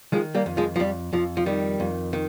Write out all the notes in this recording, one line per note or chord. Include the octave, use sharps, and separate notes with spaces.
D#3 F3 G#3
G3 A#3
F2
F3 G#3
F3
F2 G3
F2 F3
F3
D#3 G3
F2
D#3